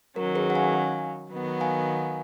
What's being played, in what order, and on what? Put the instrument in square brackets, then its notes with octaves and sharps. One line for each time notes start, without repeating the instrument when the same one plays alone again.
[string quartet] D#3 F#3 C#4 [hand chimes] A#4
[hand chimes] G#4 B4
F#5
F5 G#5
[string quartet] D#3 F#3 B3
[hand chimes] F5 G#5